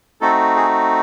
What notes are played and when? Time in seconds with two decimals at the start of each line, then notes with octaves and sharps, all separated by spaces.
0.21 A3 C4 D#4 F#4 A4
0.56 G#4